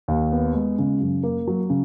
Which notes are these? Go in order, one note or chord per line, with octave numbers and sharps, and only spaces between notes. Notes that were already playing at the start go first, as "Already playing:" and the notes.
D#2
B3
G#3
C#3
F#2
A#3
F#3
C#3